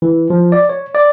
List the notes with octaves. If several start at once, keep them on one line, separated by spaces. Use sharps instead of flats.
E3
F3
D5
C#5
D5